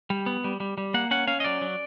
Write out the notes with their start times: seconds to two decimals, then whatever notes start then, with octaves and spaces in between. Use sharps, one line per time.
0.10 G3
0.26 B3
0.44 G3
0.60 G3
0.78 G3
0.94 A#3 F#5
1.11 C#4 F#5
1.27 C#4 F5
1.40 D#5
1.44 F#3 D5
1.62 F#3